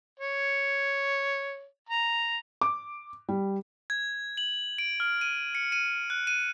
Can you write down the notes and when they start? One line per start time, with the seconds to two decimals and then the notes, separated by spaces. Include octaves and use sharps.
0.20 C#5
1.90 A#5
2.61 D6
3.29 G3
3.90 G#6
4.37 F#7
4.78 D7
5.00 F6
5.21 D#7
5.55 C#7
5.72 D#7
6.10 F#6
6.27 D#7